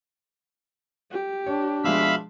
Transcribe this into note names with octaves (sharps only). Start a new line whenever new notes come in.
G4
D4 C#5
B2 F3 G#3 E5 F5 B5